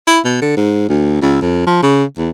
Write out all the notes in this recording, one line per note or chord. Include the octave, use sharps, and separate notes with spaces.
E4
B2
D3
G#2
D2
C#2
F2
F3
C#3
E2